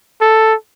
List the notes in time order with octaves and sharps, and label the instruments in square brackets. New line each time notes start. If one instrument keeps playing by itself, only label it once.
[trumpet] A4